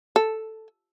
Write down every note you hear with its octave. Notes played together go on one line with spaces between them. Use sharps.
A4